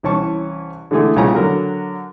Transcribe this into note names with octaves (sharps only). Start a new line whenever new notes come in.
C2 E3 C#4 A5 C#6
D3 E3 G#3 A3 E4 G#4
C2 C#3 F3 B3 G#5 A#5
D3 F#3 A#4